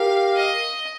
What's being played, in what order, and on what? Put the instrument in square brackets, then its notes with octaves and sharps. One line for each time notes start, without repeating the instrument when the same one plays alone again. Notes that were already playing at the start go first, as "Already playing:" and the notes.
Already playing: [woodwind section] G4 A#4 [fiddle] F5
[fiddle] D#5